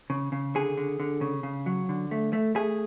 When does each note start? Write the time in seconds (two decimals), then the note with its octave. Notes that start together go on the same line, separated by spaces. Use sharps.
0.10 C#3
0.32 C#3
0.55 D3 G#4
0.77 D3
1.00 D3
1.21 C#3
1.43 C#3
1.66 F#3
1.89 D3
2.11 A3
2.33 A3
2.55 A3 G#4